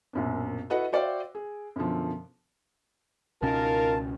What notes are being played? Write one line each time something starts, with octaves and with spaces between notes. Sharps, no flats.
A#1 F#2 B2
E4 F#4 A4 B4 D#5 F#5
F#4 C5 D5 E5 F5 G5
G#4
F#2 B2 D3 F3
C#2 B2 C#4 D#4 F4 A#4 A5